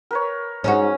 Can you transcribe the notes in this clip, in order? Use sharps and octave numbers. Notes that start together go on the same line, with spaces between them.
A#4 B4 C#5
G#2 C#4 D#4 F#4